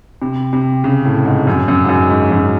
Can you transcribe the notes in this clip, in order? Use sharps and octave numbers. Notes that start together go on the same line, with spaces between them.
C3
C3
C#3
A2
G#2
F#2
F#2
G#2
F#2
G#2
F#2